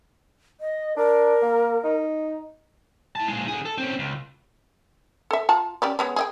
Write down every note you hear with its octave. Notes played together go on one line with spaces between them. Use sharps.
D#5
D4 A#4
A#3
D#4
E4 A5
A#2 G#3
D3 G#4
A4
C4 C#4
C#2
A4 E5
F4 A5 A#5
C#4 G4 D5
G#3 B3 C#4
G#4 D#5 G5